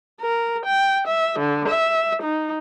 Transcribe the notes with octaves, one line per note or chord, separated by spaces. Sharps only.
A#4
G5
E5
D3
E5
D#4